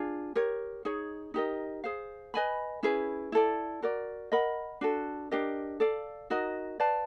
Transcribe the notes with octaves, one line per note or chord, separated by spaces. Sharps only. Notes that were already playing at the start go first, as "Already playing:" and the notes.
Already playing: D4 F4 G#4
G4 A#4 C#5
D#4 G#4 C#5
D#4 G4 A#4 D#5
G#4 C5 F5
B4 D#5 G#5 B5
C#4 E4 G#4 B4
E4 A4 D5
F#4 A#4 D5
A#4 D#5 F#5 B5
D4 F#4 A4
D4 G4 A#4 D#5
A4 D5 F5
D#4 F#4 A#4 D#5
B4 D5 F5 A5